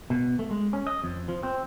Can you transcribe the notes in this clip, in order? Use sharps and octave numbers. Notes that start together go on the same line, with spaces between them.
B2
A3
G#3
C#4
D#5
F2
F3
C4